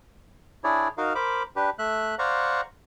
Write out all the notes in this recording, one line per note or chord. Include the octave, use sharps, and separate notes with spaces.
D4 E4 G#4 C#5 D5
D#4 F#4 A#4 F5
A#4 C5 B5 D6
D4 G4 B4
A3 E5 F#6
C5 D5 F5 F#5 A#5 C#6